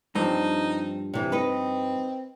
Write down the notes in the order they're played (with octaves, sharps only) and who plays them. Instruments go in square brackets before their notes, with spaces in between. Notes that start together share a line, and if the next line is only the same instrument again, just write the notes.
[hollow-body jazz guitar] G2 F3 [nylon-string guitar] C4 [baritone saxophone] D#4
[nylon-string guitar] C3 E3
[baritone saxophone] C4 [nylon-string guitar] D#4 B4 D#5